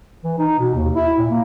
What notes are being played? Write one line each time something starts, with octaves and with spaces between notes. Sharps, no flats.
E3
D#4
B2
D#2
E4
A#2
A#3